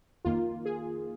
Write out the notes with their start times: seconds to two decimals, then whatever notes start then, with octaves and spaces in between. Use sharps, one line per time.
0.25 F2 D#3 A#3 F4
0.65 G#4